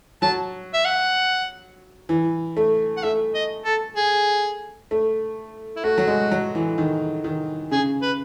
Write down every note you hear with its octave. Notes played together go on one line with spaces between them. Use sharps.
F#3 A5
E5
F#5
E3
A3
F#5
A3 E5
D#5
A4
G#4
A3
E4
A3 F#4
F#3
G#3
F#3
E3
D#3
D#3
C#3 G#4
B4